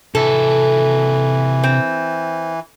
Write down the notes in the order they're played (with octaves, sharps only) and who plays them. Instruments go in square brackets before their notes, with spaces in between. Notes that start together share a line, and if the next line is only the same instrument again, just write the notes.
[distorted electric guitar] C3 F#4 [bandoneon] E3 [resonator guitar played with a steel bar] A4
[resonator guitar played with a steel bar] C4